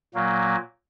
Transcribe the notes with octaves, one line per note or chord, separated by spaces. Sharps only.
A#2 F#3 A#3